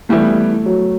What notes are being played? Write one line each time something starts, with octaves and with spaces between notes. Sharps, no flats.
E3 G3 A3 B3 E4 G4
F#3